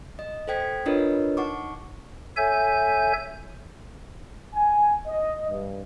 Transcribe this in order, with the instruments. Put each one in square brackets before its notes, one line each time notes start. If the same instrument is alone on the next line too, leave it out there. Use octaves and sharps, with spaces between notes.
[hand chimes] D#5
A4 C5 G5 G#6 B6
D4 F4 A#4 B4 C#5 D#5
D#4 F#5 C#6 D6
[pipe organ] A4 C#5 E5 G#5 G6
[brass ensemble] G#5
D#5
G2